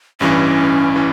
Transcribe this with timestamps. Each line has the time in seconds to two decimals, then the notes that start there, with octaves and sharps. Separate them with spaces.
0.20 A1 G2 E3 C#4
0.96 E3